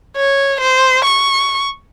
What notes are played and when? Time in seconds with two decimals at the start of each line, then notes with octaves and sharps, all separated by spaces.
0.17 C#5
0.61 C5
1.05 C#6